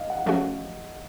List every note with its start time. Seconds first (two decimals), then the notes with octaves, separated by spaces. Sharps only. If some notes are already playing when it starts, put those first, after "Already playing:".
Already playing: D#5 F5
0.10 F#5
0.26 F3 A3 C#4 F#4